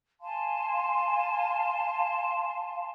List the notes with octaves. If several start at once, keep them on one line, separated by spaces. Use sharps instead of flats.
F5 G#5 A5 C6